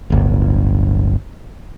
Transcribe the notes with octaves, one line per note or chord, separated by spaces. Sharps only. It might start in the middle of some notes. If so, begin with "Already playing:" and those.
D1 G1